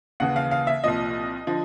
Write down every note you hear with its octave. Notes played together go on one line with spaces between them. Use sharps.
D#2 C#3 E3 F#5
F5
F5
E5
C2 A#2 F3 D#5
D3 F3